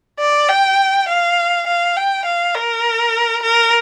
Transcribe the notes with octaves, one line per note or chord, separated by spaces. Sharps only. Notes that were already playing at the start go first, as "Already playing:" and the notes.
D5
G5
F5
F5
G5
F5
A#4
A#4